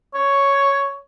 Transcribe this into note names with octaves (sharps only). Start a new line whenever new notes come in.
C#5